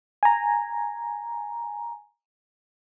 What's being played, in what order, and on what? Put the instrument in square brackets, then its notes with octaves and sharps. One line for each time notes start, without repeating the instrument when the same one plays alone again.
[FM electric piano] G#5 A#5